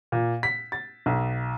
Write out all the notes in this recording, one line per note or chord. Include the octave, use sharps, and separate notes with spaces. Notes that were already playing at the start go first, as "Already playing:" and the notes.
A#2
B6
A6
B1